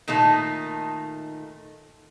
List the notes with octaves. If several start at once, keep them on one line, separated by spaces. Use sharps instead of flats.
A#2 D#3 A3 D#4